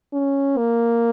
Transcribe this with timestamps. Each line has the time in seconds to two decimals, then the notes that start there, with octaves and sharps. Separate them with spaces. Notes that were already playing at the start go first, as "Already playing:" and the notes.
0.13 C#4
0.57 A#3